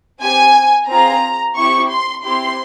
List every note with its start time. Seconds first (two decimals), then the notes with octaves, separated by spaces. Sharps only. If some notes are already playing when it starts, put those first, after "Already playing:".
0.21 C4 G4 G#5
0.88 C4 F4 G#4 A#5
1.56 C4 E4 G4 C#6
1.90 C6
2.23 C4 E4 G4 C6